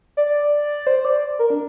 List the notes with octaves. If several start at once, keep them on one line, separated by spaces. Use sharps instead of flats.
D5
C5
D5
A#4
D4